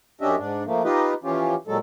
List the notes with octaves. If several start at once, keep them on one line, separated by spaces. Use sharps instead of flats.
F#2 C#4 D4 G4 D#5 E5
G#2 D4
F3 A3 A#3
D#4 F4 G4 B4 D#5
E3 F3 C#4 F4 G4
A#2 F#3 G#3 A4